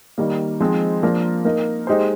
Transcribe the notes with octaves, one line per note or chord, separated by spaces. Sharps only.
D#3 G3 A#3
F3 G#3 C4 D#4
F3 A#3 D4 F4 A#4
A#3 D#4 A#4
G#3 D#4 G4 C5